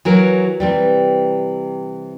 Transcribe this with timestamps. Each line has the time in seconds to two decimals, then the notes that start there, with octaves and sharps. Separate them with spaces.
0.05 E3 F#3 A#4
0.60 C3 E3 G3